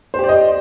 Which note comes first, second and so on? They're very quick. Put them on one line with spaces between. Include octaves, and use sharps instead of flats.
C5 G4 D5 D#5